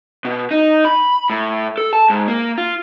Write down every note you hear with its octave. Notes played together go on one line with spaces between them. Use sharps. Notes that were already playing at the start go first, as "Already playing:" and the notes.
B2
D#4
B5
A2
A4
A5
G#2
A#3
F4